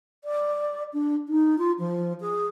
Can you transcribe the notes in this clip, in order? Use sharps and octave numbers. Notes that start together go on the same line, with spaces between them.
D5
D4
D#4
F4
F3
G#4